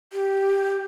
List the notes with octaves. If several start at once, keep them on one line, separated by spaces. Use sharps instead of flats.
G4